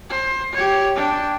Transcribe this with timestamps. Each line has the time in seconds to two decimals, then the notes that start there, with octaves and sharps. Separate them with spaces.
0.10 C5
0.53 G4 C#5
0.96 D4 G5